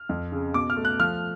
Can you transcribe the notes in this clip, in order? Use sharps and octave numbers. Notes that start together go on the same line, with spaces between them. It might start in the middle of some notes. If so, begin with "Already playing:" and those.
Already playing: F6
F2
C#3
B2 D6
F6
A3
F#6
F3 F6